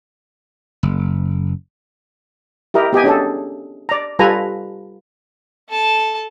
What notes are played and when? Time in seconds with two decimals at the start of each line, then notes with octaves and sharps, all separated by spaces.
0.83 F#1
2.74 E4 G4 A#4 D#5
2.93 B3 G4 D#5 G#5
3.04 C#4 D4 G#4 A4
3.89 D5 A#5
4.19 G3 F4 A4 B4 G#5 A#5
5.69 A4 A5